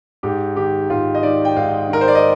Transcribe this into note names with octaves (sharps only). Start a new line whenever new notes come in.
G#2 G4
D#3 G4
G#2 F4
D#5
D#3 D5
G5
G#2 F5
D#3 A#4
C5
D5
D#5